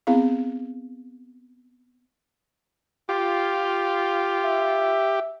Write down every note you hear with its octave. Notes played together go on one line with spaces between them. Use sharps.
B3 C4 E4 G#4 F5
F4 G4
E5